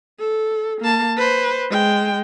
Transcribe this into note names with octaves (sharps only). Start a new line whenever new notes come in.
A4
A#3 A5
B4 C5
G#3 G5